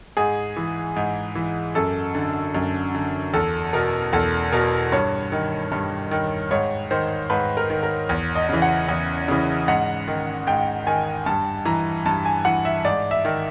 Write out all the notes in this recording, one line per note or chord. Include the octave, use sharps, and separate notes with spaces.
G#2 G#4
E3
G#2
E3
F#2 A4
D3
F#2
D3
E2 A4
B2 A#4
E2 A4
B2 A#4
G2 C#5
D#3
G2
D#3
G#2 C#5
D#3 C5
G#2 B4
A#4
D#3
A#4
E2
D#5
C#3 E3
F#5
E2
C#3 E3
G#2 F#5
D#3
G#2 G5
D#3 G#5
G2 A5
E3 A#5
G2 A5
G#5
E3 F#5
E5
G#2 D5
E5
D#3